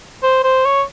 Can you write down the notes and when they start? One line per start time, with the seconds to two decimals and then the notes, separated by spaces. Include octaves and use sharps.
0.23 C5
0.43 C5
0.65 C#5